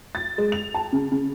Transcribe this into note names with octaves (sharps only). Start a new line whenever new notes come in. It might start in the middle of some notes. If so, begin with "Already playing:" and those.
A6
G#3
F7
A5
C#3
C#3